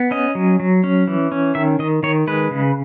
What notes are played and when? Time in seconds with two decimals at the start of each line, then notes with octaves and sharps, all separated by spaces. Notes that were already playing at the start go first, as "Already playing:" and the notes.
Already playing: B3
0.11 C#4 D#5
0.35 F#3
0.60 F#3
0.84 C#4
1.07 E3
1.32 C#4
1.55 D#3 E5
1.79 D#3 D#5
2.03 D#3 C#5
2.27 G#3 B4
2.51 C#3